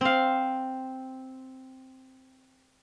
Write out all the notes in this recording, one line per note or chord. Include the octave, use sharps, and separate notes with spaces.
C4 F5